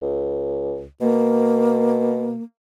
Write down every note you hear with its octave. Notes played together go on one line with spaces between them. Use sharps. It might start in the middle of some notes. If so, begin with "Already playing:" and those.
C#2
B2 A#3